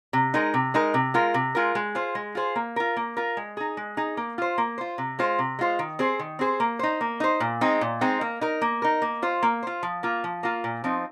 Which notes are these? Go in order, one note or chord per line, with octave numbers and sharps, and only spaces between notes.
C3
G#3 D#4 A#4
C3
G#3 D#4 A#4
C3
G#3 F4 A#4
C3
G#3 F4 A#4
G#3
F4 G#4 C5
G#3
F4 G#4 C5
A#3
F4 A#4
A#3
F4 A#4
G#3
D#4 G#4
G#3
D#4 G#4
A#3
F4 C5
A#3
F4 C5
C3
G#3 F4 C5
C3
G#3 F4 C5
D#3
C4 G#4 C5
D#3
C4 G#4 C5
A#3
D#4 C5
A#3
D#4 C5
A#2
G#3 C4 D#4
A#2
G#3 C4 D#4
A#3
D#4 A#4
A#3
D#4 A#4
A#3
F4 C5
A#3
F4 C5
F3
A#3 F4
F3
A#3 F4
A#2
F3 C4 D#4